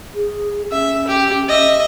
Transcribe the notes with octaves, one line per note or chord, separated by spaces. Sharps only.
G#4
C#4 E5
G4
D#5 E5